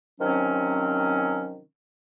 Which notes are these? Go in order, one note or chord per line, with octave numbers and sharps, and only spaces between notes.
C3 D#3 F3 F#3 C4 C#4